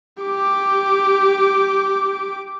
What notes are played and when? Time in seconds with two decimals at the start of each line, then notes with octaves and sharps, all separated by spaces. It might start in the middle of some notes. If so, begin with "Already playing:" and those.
0.22 G4 D6